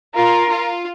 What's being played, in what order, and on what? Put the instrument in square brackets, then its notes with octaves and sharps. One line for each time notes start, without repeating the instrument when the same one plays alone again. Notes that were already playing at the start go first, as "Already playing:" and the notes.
[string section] F4 [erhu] A#4
[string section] F4